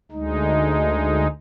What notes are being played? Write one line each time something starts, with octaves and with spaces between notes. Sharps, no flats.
D2 G#3 D#4